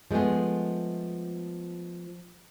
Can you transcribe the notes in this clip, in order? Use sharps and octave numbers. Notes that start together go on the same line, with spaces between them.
F3 G#3 A3 B3 G#4